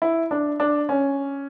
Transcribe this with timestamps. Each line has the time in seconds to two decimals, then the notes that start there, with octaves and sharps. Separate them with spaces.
0.02 E4
0.31 D4
0.60 D4
0.89 C#4